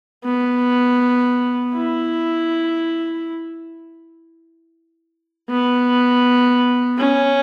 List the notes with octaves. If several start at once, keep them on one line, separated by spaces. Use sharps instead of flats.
B3
E4
B3
C#4